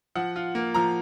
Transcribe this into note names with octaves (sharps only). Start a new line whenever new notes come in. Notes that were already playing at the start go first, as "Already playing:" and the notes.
F3 F#5
F4
A#3
F3 A#5